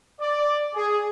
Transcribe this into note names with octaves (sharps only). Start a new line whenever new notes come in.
D5
G#4